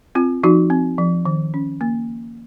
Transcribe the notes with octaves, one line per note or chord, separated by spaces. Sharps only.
C4 F4
F3 D#4 F#4
C4
F3
D#3
C#4
A#3